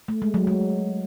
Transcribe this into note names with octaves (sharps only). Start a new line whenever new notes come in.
A3
G#3
F#3
G#3